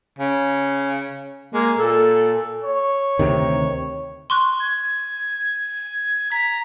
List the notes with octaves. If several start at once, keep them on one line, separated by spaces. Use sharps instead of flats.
C#3
G#3 A#3
A#2 A4
C#5
D2 C3 D#3
C6 C#6 F#6
G#6
A#5 B6